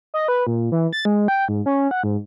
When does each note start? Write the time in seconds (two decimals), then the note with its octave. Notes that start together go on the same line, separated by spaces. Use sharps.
0.14 D#5
0.28 B4
0.47 A#2
0.72 E3
0.93 A6
1.05 G#3
1.28 G5
1.48 G#2
1.66 C#4
1.91 F#5
2.03 G#2